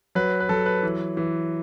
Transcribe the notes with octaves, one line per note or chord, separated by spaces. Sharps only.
F#3 B4
B4
F#3 A4
B4
E3
E3